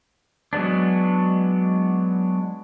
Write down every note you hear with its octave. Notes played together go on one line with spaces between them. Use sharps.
F#3 G#3 B3 D4